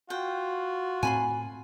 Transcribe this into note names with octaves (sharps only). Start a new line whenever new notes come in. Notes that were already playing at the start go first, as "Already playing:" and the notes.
F4 F#4 G5
A2 C4 G#5 B5 C6